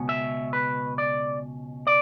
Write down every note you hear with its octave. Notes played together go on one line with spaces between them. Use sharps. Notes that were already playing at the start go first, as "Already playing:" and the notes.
Already playing: C#2 B2 C#4
E5
B4
D5
D5